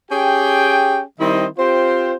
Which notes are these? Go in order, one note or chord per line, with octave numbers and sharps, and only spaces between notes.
C#4 G4 G#4 G5
D#3 G3 C4 E4 C5 D#5
C4 F4 G4 C5